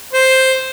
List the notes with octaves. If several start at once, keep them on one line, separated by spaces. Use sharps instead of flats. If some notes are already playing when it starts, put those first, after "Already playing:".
C5